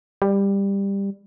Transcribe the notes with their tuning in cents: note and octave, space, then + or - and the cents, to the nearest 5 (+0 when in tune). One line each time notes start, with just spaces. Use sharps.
G3 +15